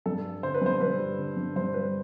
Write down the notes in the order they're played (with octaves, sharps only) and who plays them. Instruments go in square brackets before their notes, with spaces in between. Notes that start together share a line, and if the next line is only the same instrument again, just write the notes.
[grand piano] G2 A4
G3
D3 C5
B4
G2 C5
G2 B4
G3
D3
G2
G2 C5
G3 B4